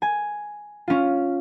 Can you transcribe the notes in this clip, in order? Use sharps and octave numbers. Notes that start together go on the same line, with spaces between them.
G#5
C#4 F4